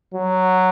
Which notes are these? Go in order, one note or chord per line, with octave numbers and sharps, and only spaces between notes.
F#3